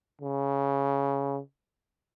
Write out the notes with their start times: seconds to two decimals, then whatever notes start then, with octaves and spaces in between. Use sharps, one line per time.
0.21 C#3